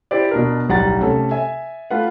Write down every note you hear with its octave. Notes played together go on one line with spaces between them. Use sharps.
E4 G4 B4 C5 D5
B2 D4 A#4
D1 B1 G3 F#5 A#5 A6
C3 A3 C#4 A4
E5 G#5
A3 F4 B4 F#5